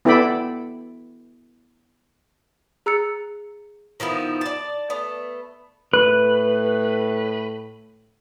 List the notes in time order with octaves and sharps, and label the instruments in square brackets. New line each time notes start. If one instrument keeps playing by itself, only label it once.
[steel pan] B3 E4 A4 D5 G5 B5
[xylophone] G#4 A#5 E6 F#6 A6 C#7
[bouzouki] D#3 F3 B3 E4
D5 A5
A3 B3
[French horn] A2 [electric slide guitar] B4